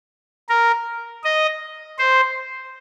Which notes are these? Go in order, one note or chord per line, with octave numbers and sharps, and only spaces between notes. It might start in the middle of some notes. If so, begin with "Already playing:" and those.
A#4
D#5
C5